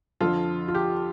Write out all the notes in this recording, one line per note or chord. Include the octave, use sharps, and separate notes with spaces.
F2 D3 F3 F4 A4
F4
G4